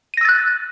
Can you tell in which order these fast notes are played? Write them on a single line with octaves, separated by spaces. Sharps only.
D#7 A#6 E6 A6 F#6